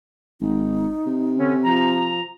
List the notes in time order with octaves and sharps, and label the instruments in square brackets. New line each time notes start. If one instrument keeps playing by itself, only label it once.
[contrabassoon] G#1 [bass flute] D#4
[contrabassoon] C3
[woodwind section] D3 C#4
[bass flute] F3 [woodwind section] A#5